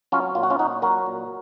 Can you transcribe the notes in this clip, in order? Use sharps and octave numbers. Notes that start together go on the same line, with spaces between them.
F#3 C#4 F4
A#2 F4
F#4
C#4 F4
A#2 D#4 F#4
F#3 F#4 A#4
A#2